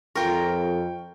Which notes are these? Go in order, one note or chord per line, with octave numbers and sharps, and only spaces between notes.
F2 F4 A#4 G5 C#6